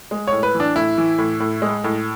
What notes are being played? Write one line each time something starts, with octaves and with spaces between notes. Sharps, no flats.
G#3
A2 C#5
B4
E3
D4
A2 E4
E3
A2
A2
G#3
A2